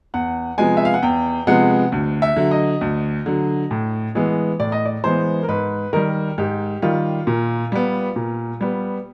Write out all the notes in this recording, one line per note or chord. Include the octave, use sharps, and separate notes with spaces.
E2 F#5
C3 F3 G#3 B3 G#5
E5
F5
F#5
E2 G5
C3 F3 G#3 B3 F#5
D2
E5
D3 F#3
D#5
D2
D3 F#3
A2
E3 G#3 B3
A2 D5
D#5
D5
E3 G#3 B3 C5
A#4
G#2 B4
D#3 G3 A#4
G#2 G4
D#3 G3 F4
A#2
G3 B3
A#2
G3 B3